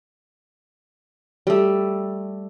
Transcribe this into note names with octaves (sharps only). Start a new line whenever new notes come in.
G3 A3